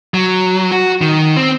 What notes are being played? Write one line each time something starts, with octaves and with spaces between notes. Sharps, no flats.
F#3
F#4
D#3
C4